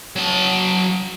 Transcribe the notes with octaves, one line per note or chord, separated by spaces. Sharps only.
F#3 A5